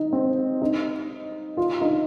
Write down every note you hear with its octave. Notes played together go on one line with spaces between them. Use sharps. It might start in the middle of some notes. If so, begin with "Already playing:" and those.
Already playing: D#4
C4
D#4
F4
D#4